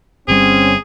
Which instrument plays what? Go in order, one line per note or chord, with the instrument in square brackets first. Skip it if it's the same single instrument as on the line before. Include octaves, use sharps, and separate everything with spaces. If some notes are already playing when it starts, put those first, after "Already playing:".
[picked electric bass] G1 G3 [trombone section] C4 C#4 [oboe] G#4